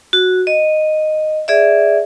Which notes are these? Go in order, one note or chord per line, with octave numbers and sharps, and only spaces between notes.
F#4
D#5
G#4 D5 E5